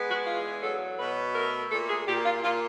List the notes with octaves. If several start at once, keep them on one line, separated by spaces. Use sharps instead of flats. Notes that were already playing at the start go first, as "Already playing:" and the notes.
Already playing: G#3 B3
F#4
E2 F4
F#3 A4
B2 B4
A3 A#4
A#2 A4
G#4
A#2 G4
F4
A#2 F4